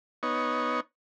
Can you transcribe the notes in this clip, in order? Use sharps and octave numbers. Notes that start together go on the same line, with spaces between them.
B3 D#4 C#5